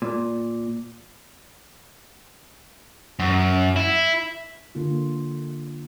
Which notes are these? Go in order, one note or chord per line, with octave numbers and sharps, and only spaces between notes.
A#2
F#2
E4
D3 A#3 F4